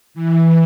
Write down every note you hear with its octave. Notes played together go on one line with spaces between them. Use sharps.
E3